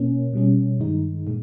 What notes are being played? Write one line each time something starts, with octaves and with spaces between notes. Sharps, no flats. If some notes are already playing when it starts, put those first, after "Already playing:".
Already playing: B2 A#3 C#4
B2 G3 C#4
G2 D#3 G#3 D#4
A#2 G#3